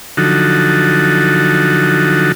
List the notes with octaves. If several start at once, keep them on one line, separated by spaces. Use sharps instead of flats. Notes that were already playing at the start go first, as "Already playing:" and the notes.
D3 F3 F#3 D#4 F#4 A4